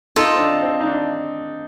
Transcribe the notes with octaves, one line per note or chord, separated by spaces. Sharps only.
D#4 F4 A4 D#5
C4
D4
C4
D#4
D4